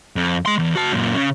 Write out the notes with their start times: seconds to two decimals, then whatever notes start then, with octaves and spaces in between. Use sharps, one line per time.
0.16 F2
0.46 G#3 C6
0.59 E2
0.76 F#4 A5
0.92 F#2 A#2
1.16 C#3